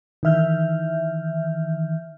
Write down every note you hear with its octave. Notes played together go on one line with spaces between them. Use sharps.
D#3 E3 E5 F6 G6